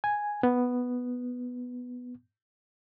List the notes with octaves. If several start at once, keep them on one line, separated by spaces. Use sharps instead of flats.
G#5
B3